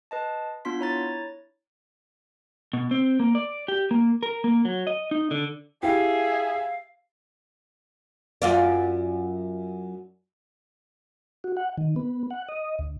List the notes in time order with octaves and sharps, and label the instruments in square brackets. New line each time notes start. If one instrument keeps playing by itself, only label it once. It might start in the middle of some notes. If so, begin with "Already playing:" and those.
[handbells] B4 D#5 A5
B3 D4 F4 C6 B6
E4 C#5 A#5 A6
[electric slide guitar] B2
C4
A#3
D5
G4
A#3
A#4
A#3
F#3
D#5
D#4
D3
[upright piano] E4 G4 [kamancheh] G#4 E5 [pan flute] F5
[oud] F#2 F4 D5
[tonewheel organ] F#4
F#5
D#3
B3
F#5
D#5
D2